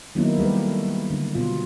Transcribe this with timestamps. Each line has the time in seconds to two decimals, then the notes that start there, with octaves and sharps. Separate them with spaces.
0.15 D#3 F#3 A#3 B3 D#4 E4
0.38 G3 A3 G4 B4
1.10 D3
1.35 B2 F4